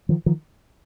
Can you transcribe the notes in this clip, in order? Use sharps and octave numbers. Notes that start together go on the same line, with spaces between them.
D#3 F3
D#3 F3